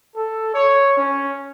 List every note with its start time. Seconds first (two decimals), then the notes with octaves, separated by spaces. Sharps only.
0.16 A4
0.54 C#5
0.98 C#4